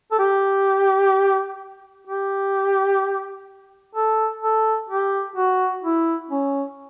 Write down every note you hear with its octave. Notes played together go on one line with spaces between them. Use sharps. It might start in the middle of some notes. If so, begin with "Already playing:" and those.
A4
G4
G4
A4
A4
G4
F#4
E4
C#4